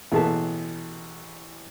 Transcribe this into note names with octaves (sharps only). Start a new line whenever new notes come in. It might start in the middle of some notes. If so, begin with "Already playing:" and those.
A1 B2 G#4 A4 B4 A5